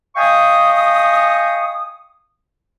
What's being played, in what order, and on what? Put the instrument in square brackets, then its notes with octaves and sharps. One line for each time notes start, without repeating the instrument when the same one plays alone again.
[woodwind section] D#5 F5 G5 G#5 C#6 D#6